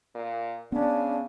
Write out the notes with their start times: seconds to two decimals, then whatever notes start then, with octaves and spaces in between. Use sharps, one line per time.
0.15 A#2
0.72 C#3 B3 C#4 D4